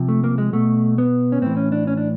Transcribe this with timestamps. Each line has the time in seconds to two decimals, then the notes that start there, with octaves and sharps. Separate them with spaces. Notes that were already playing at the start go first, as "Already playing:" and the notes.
Already playing: C3 F3
0.08 A3
0.24 A#3
0.38 G#3
0.53 B2 A3
0.98 B3
1.32 C#4
1.42 A2 E3 C4
1.57 C#4
1.72 D4
1.87 C#4
1.97 D4